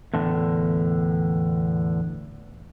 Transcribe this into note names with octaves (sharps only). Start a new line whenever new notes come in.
E2 A2 D3